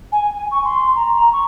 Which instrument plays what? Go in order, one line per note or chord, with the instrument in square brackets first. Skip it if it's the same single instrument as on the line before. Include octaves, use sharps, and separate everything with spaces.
[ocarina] G#5
G#5
C#6
C6
A#5
A#5
C#6